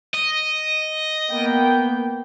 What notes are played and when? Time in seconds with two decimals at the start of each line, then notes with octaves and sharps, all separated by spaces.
0.14 D#5
1.31 A#3 B3 G5